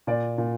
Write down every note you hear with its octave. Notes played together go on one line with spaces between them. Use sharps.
A#2 D5
A#2